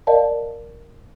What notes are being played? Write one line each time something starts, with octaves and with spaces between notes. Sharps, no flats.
A#4 D5 D#5 F5 A5